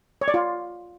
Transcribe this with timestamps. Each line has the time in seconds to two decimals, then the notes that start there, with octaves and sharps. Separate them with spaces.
0.21 C#5
0.28 D5
0.34 F4